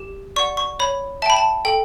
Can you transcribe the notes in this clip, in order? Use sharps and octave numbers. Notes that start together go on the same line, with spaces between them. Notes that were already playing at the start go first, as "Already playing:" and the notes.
Already playing: G4
D5 F#5 C#6
C#6
C#5 B5
E5 G5 A5 B5
A5
A4 G5